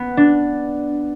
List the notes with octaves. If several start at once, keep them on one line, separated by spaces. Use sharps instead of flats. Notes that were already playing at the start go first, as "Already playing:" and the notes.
Already playing: B3
D4